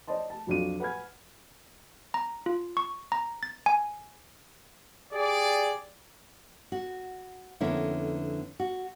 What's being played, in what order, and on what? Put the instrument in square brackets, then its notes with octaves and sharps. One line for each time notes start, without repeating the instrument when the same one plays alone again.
[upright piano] C5 D5 D#5 A5 C6
A5
B1 F2 F#3 D4 F4 D#7
B4 F#5 G#5 B5 F6 G#6
[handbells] A#5
F4
C#6
A#5
A6
G#5
[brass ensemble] G4 G#4 D5
[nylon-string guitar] F#4
F2 D3 A#3 B3 C#4 E4
F#4